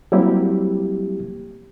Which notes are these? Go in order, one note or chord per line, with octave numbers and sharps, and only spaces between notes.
F#3 G3 A#3 C4 E4 G4